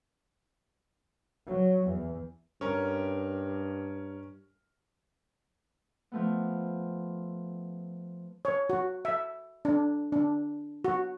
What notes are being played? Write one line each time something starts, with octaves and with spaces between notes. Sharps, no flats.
F#3
E2
G2 C#4 A#4
F3 A3 B3
C#5
F#4
E5
D4
D4
F#4